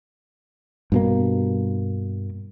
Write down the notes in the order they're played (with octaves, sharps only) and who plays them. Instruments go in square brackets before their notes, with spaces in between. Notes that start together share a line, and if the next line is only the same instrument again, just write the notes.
[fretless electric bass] G2 B2 A#3